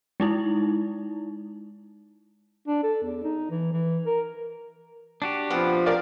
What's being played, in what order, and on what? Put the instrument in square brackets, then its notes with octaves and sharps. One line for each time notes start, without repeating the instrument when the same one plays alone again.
[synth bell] G#3 D#4 E4
[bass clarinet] D4
A4
E2
D#4
E3
E3
A#4
[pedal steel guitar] D4 F#4 G4
[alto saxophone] F3 [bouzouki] B3 C4 F#5
[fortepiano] A#4 D5 F5